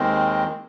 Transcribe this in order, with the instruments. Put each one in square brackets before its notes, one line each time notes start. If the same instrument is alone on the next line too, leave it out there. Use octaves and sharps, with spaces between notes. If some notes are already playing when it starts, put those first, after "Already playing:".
Already playing: [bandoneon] D#2 D#3 G#3 C4